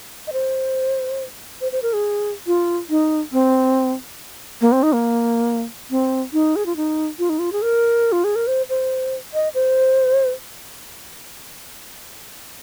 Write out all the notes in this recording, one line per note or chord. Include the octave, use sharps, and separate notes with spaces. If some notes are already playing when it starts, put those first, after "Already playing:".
D#5
C5
C5
C5
A#4
G#4
F4
D#4
C4
A#3
C4
D#4
A#3
C4
D#4
G#4
F4
D#4
F4
D#4
F4
G#4
A#4
F4
G#4
A#4
C5
C5
D#5
C5